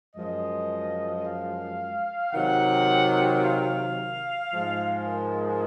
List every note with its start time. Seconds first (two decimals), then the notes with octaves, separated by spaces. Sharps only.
0.15 F#2 F3 G#3 D#5
1.24 F5
2.33 C3 D#3 F#3 F#5
3.42 F5
4.51 G#2 F3 G#3
5.06 A#4